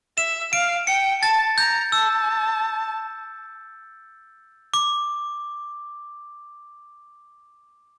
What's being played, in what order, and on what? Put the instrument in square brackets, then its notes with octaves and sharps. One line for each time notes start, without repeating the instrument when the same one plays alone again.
[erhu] E5 [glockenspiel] E7
[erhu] F5 [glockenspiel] D7
[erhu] G5 [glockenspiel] C#7
[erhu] A5 [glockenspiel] A6
[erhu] A#5 [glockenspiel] G6
[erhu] A5 [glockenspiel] E6
[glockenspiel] D6